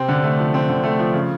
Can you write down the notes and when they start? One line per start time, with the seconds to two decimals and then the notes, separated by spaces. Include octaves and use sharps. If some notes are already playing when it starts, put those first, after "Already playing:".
Already playing: C3 C4
0.08 D3
0.24 A3
0.39 F3
0.54 C4
0.69 D3
0.84 A3
0.99 F3
1.14 C#3